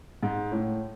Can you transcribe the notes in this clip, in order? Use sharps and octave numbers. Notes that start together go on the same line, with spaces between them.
G#2
A2